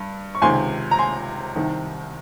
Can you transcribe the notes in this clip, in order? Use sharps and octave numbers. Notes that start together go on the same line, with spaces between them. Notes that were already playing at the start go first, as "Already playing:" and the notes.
Already playing: G2
C#6
C#2 C3 D#3 G#5 C6
A#5
G#5 C6
C2 C3 D#3